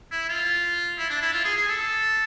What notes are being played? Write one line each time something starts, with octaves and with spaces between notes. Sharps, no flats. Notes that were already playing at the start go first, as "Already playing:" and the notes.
E4
F4
E4
D4
E4
F4
G#4
G#4
A4